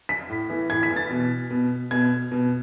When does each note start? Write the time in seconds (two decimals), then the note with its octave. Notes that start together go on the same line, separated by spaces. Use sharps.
0.09 B6
0.29 A2
0.50 E3
0.70 A2 G#6
0.83 B6
0.90 E3
0.96 A6
1.10 B2
1.50 B2
1.91 B2 G#6
2.31 B2